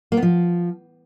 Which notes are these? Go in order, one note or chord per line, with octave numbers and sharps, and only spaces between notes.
A#3
B3
F3